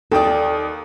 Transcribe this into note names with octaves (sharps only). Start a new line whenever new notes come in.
D#2 A4 D5 G5 D#6